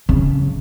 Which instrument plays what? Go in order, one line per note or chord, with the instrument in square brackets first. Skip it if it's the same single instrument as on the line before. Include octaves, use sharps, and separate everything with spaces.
[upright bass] C#3